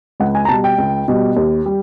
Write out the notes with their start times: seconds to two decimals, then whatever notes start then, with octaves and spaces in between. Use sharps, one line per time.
0.20 C#2 F#5
0.35 G#5
0.45 A#5
0.49 B2 G3 A5
0.64 G5
0.78 C#2
1.08 B2 G3
1.36 D#2
1.66 G3